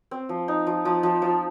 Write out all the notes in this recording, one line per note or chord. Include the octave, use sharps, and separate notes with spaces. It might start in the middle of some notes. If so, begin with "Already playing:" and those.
C4
F3
D#4
F3
F3
F3
F3